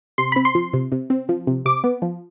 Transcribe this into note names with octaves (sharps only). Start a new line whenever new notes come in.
C3 C6
C4 B5
C6
F3
C3
C3
C4
F3
C3
C3 D6
B3
F3